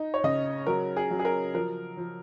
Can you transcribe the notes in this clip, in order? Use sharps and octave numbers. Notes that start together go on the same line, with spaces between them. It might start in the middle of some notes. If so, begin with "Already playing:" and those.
Already playing: D#4
C#5
C#3 D#5
F#3 A#4
G#4
F#3
G#4
A#4
F3 A#4
F3